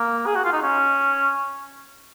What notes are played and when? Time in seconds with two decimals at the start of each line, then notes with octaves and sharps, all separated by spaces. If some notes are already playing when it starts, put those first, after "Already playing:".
Already playing: A#3
0.26 G#4
0.35 F#4
0.45 F4
0.53 D#4
0.62 C#4